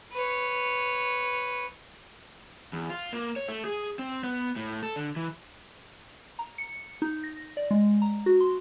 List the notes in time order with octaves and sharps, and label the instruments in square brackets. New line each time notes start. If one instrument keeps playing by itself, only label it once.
[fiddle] B4 C#5
[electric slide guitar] E2
F4
A#3
C#5
A3
G#4
C4
B3
A2
A4
D3
E3
[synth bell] A#5
C#7
D#4
A#6
D5
G#3
A#5
F#4
C6